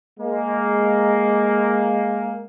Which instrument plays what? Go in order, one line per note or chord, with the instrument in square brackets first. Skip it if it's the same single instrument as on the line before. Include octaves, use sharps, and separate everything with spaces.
[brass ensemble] G#3 A#3